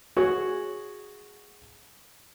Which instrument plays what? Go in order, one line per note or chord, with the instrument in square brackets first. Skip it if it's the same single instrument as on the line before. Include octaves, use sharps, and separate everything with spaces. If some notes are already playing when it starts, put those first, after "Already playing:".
[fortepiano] F#4 G#4 C#5